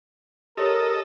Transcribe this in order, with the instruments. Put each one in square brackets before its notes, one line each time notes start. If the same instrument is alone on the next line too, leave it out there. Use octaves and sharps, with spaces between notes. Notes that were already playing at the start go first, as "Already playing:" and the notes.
[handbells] G4 C#5 [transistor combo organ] A4 D#5 [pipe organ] A#4